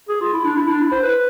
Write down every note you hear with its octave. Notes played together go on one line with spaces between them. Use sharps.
G#4
F4
E4
D4
E4
D4
E4
C5
B4